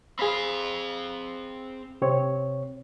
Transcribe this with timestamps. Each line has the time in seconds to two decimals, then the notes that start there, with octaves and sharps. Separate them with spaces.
0.19 C4 G#4 F5 B5
2.02 C3 C4 C#5